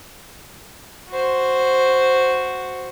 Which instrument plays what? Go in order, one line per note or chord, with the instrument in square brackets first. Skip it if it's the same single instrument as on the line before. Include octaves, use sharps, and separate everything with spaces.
[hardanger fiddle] F#4 C5